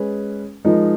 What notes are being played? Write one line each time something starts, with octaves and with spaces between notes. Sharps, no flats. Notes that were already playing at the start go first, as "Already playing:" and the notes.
Already playing: G#3 C#4 G#4 B4
F3 G#3 D#4 A#4